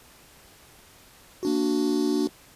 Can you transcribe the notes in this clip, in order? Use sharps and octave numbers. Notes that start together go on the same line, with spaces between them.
A#3 D4 F#4